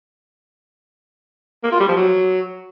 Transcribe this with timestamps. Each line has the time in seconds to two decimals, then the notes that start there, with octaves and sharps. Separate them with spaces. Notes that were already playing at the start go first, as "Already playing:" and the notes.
1.63 A#3
1.72 F4
1.80 G3
1.88 F3
1.96 F#3